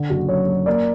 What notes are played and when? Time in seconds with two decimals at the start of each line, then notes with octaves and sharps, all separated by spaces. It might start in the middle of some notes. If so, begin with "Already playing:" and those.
Already playing: D3
0.10 F#1 F#4
0.28 F#2 C#5
0.47 F#3
0.66 A#3 D5